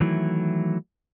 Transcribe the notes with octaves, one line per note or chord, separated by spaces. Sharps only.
D#3 E3 F#3 A3 E4